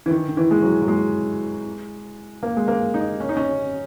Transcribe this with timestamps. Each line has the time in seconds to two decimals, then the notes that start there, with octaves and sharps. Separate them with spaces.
0.06 E3
0.11 D#3
0.28 D#3
0.37 E3
0.51 G#3
0.62 F#3
0.82 F#3
0.88 G#3
2.43 A#3
2.57 G#3
2.68 A#3
2.94 D#4
3.20 C#4
3.29 D#4
3.37 C#4